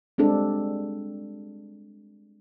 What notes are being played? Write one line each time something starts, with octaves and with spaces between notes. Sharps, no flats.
G3 G#3 C4 D4 A4